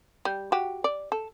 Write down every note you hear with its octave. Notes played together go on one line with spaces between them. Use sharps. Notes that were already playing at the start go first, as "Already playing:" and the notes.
G3
F#4 G4
D5
A4